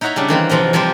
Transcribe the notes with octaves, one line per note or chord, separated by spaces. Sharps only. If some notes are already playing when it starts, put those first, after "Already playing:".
D#4 E4 C#5 F#5 A#5 B5
C#3 G3 D4
D#3 E3 A#3 C4
E2 C3 F3 A#3 D#5
C3 F3 G3 G4 C5